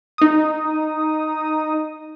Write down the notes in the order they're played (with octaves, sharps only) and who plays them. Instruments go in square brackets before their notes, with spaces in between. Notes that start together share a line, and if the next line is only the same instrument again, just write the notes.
[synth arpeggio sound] D#4 D#6